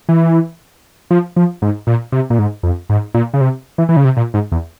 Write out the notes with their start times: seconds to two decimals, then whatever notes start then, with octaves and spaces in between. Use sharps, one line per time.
0.09 E3
1.11 F3
1.36 F3
1.62 G#2
1.87 A#2
2.12 C3
2.30 A#2
2.39 G#2
2.63 F2
2.89 G#2
3.14 A#2
3.34 C#3
3.41 C3
3.78 E3
3.89 E3
3.97 C#3
4.05 C3
4.17 A#2
4.34 G#2
4.52 E2